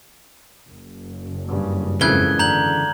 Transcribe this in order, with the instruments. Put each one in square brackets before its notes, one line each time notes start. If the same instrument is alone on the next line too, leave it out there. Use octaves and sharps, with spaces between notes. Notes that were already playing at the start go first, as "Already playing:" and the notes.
[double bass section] F#1
[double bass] G2 C#3
[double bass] G#1 F2 [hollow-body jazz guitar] C#3 E3 [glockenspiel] F#6 G#6 G7
[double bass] D3 [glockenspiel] A#5 G6 F#7